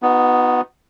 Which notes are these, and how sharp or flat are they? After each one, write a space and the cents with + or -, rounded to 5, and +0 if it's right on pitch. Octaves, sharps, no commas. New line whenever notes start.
B3 +10 D#4 +5 F#4 -40